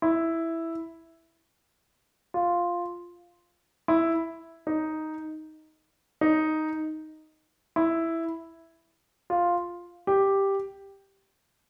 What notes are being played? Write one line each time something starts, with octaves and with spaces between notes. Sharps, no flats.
E4
F4
E4
D#4
D#4
E4
F4
G4